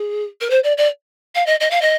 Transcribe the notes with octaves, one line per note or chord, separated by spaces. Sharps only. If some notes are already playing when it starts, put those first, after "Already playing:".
Already playing: G#4
A#4
C5
D5
D5
F5
D#5
D#5
F5
D#5